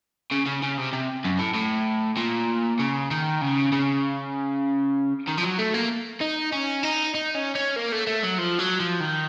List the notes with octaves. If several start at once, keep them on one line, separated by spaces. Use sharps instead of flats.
C#3
C#3
C#3
C3
C3
F#2
A2
A2
A#2
C#3
D#3
C#3
C#3
D#3
F3
F#3
A3
A#3
D#4
C#4
D#4
D#4
C#4
C#4
A#3
A3
A3
F#3
F3
F#3
F3
D#3